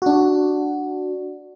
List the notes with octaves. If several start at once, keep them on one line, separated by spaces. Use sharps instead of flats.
D4 F#4